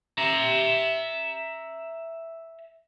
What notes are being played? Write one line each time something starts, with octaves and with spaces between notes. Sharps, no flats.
E5 A#5